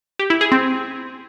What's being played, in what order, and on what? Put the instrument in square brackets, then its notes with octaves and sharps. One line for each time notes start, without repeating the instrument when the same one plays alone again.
[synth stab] G4
E4
G#4
C4